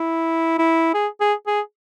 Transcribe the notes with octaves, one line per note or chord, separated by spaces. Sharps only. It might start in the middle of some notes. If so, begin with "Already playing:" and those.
Already playing: E4
E4
G#4
G#4
G#4